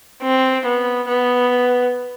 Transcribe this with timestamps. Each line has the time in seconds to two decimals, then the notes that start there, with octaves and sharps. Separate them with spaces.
0.23 C4
0.66 B3
1.08 B3